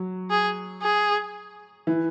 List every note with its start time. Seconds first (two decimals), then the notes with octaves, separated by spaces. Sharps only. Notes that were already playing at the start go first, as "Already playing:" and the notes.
Already playing: F#3
0.31 G#4
0.82 G#4
1.87 E3